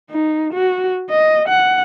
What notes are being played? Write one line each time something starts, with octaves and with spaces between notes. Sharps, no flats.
D#4
F#4
D#5
F#5